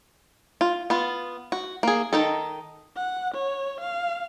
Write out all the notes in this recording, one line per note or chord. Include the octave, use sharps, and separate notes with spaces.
F4
B3 F4
F#4
A#3 G#4
D#3 D#4 A4
F#5
C#5
F5